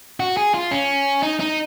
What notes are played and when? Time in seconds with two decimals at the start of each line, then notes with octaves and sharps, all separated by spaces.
0.20 F#4
0.37 G#4
0.54 F4
0.71 C#4
1.23 D#4
1.40 D#4